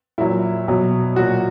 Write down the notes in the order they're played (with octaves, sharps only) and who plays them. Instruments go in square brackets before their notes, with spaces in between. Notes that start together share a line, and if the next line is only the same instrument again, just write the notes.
[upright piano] A#2 F#3 E4
B2 F#3
A#2 F#3 F#4